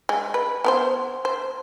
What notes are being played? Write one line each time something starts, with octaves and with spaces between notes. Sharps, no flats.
G#3
B4
B3 A#4 C5
C5